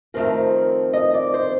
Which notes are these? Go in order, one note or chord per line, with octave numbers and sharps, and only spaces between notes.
F2 D#3 A3 C4 A#4
D#5
D5
C5